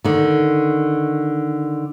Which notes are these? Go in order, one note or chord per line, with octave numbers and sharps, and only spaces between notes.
D3 D#3